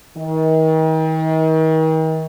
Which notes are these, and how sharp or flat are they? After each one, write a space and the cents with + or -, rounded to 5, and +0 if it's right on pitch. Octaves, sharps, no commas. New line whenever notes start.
D#3 +40